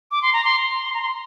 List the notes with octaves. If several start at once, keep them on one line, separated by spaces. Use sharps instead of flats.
D6
C6
A#5
C6
C6
A#5
C6